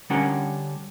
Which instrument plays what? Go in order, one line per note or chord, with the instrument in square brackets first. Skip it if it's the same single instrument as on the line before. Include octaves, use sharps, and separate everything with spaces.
[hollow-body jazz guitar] D3 G3 C#4 D4 A#4 F#5